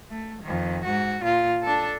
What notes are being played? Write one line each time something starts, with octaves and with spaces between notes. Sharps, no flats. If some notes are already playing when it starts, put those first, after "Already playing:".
A3
F2 D#3
G#2 F#4
A#2 F4
D4 A4